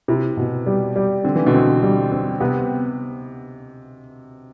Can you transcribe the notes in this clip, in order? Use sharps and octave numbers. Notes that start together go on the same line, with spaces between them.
C3 E4
B2
G3
G3
D3 C4
E3
B2 D3
C4
G3
C4
C3 B3